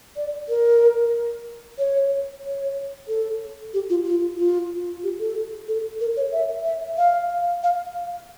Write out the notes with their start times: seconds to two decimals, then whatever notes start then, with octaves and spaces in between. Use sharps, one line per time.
0.16 D5
0.49 A#4
1.78 C#5
2.44 C#5
3.08 A4
3.74 G4
3.90 F4
4.05 F4
4.38 F4
5.04 G4
5.20 A4
5.68 A4
6.01 A#4
6.17 C#5
6.33 E5
6.65 E5
6.98 F5
7.63 F5